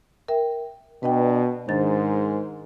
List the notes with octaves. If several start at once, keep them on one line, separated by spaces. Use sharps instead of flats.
A#4 E5 G5
B2 D4 B4 D#5 G5
G#2 D#3 D4 G#4 A#4 C5 A6